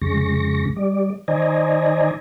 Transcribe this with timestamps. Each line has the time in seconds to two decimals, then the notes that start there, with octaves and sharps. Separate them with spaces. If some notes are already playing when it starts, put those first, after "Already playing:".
0.02 F2 C#3 G#3 C#6 A#6
0.76 G3 D5
1.28 D#3 C5 D5 D#5 G#5 A#5